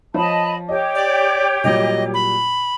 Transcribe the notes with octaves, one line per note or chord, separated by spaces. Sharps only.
F3 C#5 D#5 A5 B5
G4 C#5 D#5 D6
D5
A#2 F#3 G3 D#5
B5